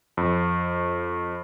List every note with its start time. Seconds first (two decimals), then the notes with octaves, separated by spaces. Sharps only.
0.17 F2